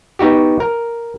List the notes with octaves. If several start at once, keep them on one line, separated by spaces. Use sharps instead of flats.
B3 D#4 F#4 G4
A#4